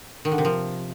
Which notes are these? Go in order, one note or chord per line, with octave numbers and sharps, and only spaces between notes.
D#3
D3
C3
F3